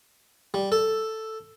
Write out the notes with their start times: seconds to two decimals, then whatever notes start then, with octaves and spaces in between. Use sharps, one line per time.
0.54 G3
0.72 A4